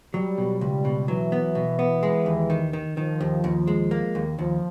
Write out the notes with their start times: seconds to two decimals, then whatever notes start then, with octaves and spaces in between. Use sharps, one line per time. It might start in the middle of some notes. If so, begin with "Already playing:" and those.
0.14 F#3 G3
0.38 B2
0.61 C#2 G3
0.85 B2
1.08 E3 F#3
1.32 B3
1.55 B2
1.79 B3
2.03 G#3
2.26 D#2
2.50 D#3
2.73 D#3
2.97 D#3 F3
3.21 D#2
3.44 D#2
3.67 G#3
3.91 A#3
4.15 D#2
4.39 D#2 F3